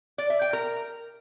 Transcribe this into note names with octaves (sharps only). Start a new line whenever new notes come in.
D5
E5
G5
A#4